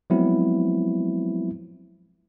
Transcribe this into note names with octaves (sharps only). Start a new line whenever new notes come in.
F3 F#3 G#3 B3 C4 E4